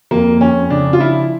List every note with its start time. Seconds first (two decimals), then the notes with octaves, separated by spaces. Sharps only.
0.11 F2 A#3
0.41 F2 C#4
0.70 C#3 D4
0.93 F4
1.00 F3 E4